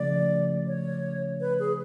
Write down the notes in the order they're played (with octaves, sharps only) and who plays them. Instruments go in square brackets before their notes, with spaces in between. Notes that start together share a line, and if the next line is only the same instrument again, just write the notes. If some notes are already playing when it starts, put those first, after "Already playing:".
Already playing: [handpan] C#3 F3 A3 C#4 [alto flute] D5
[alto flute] C#5
B4
G#4